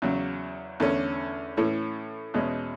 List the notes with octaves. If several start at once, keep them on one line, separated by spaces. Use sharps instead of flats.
E2 C#3 F#3
E2 D3 A3 C#4
A2 E3 A3 C#4
E2 B2 G#3 C#4